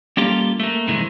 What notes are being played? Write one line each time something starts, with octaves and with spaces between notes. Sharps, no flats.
G3 A#3 C#4 F4 G4 A4
A3 A#3
G2 C3 D#3 E3 G#3